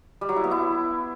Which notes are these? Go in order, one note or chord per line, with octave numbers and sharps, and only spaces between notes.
G3
F#3
E4
B3
E4